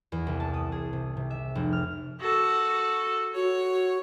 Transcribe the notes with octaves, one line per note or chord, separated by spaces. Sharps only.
E2
C2
A5
D#6
G#4
C3
C3
E5
F1
F6
F#4 A4
F#4 C#5